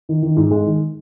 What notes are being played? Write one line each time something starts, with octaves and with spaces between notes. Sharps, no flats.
D#3
D#3
G#2
G#3
D#3